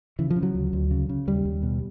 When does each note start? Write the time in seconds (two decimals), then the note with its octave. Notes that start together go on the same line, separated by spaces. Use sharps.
0.19 C#3 E3
0.30 F3
0.36 C#3
0.43 F#3
0.55 D2
0.73 D2
0.91 C#3
1.09 C#3
1.27 D#2 G3
1.45 D#2
1.63 B2